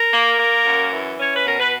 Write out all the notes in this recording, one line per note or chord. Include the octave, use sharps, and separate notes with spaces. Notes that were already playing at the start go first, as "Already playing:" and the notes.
Already playing: A#4
A#3
A#3
F#2
E3
C#4 C#5
B4
B2 A#4
B4